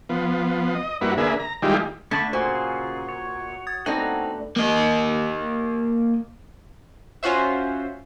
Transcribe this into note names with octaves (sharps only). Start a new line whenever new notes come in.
F3 B3
D#5
G2 A#3 E4 F#4 B4
D3 A#3 G#4 B4 E5
A#5
D#3 G3 G#3 E4 F4 G4
D3 A3 B3 A5 B5 C#6
A#2 C#3 F4 F#4 G#4 C5 G#5
C#5
D#6 G#6 A6
A3 B3 C4 D4 D#4 F#5 A#5
A#3 D#5
C#4 F4 F#4 C5 E5